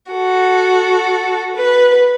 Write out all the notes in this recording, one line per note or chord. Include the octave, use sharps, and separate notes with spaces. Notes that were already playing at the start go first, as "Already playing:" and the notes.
F#4 A4
B4